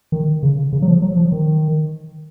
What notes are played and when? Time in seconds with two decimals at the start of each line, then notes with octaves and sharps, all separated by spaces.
0.12 D#3
0.43 C#3
0.73 C#3
0.82 F#3
0.88 F3
1.02 F#3
1.17 F3
1.32 D#3